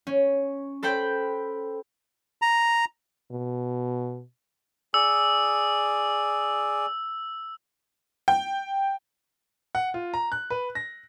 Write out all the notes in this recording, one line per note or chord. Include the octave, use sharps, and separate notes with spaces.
C#4
A4 B4 C5 G5 B5
A#5
B2
G#4 D5 E6
G5
F#5
F4
A#5
F#6
B4
A#6